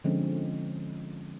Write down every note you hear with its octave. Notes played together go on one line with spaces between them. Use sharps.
D3 F3 G#3 C4 C#4